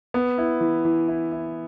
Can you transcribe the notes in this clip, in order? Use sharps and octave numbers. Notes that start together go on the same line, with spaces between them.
B3
E4
E3
E3
E4
E4